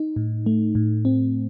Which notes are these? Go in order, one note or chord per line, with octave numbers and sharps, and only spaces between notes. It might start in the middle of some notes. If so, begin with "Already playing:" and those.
Already playing: D#4
A2
A3
A2
C4